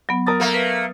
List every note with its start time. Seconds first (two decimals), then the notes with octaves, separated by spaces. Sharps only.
0.09 F#3 B3
0.26 A#4 D#6 A6
0.40 A3 A#3
0.54 B4